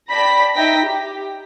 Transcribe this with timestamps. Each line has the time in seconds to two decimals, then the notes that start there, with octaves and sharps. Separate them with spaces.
0.10 D5 G5 A5 B5 A#6 B6
0.55 D#4 E5 G5 A#6 B6
0.85 G4